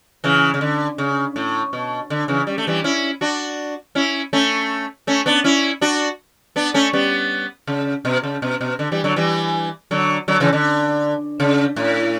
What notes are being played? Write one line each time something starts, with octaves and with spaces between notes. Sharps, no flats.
C#3 E3
C#3
D3
C#3
A2
B2
D3
C#3 E3
G3
A3
E3 G3
C#4 E4
D4 F#4
C#4 E4
A3 C#4
A3 C#4
B3 D4
C#4 E4
D4 F#4
B3 D4
A3 C#4
G3 B3
C#3
B2
C#3
B2
B2
D3
E3 G3
D3 F#3
E3 G3
D3 F#3
D3 F#3
C#3 E3
D3
C#3
A2